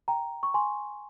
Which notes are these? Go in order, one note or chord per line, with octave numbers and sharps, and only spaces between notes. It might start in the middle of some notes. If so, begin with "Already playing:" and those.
G5 A#5
C#6
G#5 C6